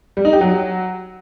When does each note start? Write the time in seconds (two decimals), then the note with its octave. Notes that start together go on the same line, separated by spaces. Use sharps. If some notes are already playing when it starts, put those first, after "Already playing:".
0.17 G3
0.25 D#4
0.33 G4
0.41 F#3